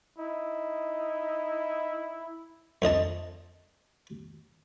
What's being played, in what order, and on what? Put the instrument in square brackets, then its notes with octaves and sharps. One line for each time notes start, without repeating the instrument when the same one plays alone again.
[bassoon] D#4 [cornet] E4
[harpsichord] F2 D3 D#5 A5